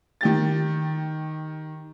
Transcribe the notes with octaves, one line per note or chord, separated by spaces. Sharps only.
D#3 G4 A6